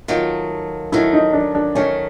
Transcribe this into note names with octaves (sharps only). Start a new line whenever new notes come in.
D#3 F#3 A3 F4
D#3 F#3 A3 E4
D#4
D4
D4
D#3 F#3 A3 C#4